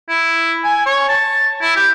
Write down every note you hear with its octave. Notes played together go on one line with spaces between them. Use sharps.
E4
G#5
C#5
A5
E4
G4